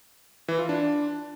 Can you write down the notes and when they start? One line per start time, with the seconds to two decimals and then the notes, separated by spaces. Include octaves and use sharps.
0.48 E3
0.59 F4
0.69 D4